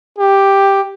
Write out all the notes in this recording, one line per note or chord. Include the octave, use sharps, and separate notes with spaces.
G4